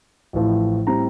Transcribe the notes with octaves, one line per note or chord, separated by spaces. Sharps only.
A1 A2 F3
A2 G3 C4 A#5